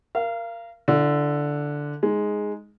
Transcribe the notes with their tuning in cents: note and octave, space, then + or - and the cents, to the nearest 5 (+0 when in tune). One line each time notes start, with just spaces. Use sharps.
A#4 +0 F5 -30
D3 +0 E4 +35
G#3 +0 D#4 +0